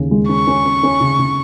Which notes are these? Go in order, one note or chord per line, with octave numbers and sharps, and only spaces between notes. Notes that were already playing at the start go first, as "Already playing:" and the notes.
Already playing: D#2 C#3 C#4
G#3
C#4 C#6
C#4
C#4
C#4
C#3
C#3